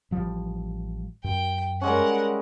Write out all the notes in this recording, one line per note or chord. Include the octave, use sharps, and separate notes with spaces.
A1 F3 G3
F#2 G5
G3 G#3 C#4 A#4 F#5